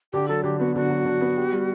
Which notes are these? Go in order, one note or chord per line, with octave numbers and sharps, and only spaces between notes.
D3 G4
F#3 A4
D3 G4
B3 F#4
D3 F#4
F#3
D3
B3
G4
G3